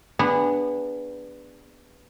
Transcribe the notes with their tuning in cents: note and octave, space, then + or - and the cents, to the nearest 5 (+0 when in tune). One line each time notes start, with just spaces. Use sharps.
B3 +0 D4 +0 G#4 -30